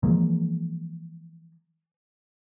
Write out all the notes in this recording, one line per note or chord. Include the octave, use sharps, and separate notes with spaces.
E3 F3 G#3 A#3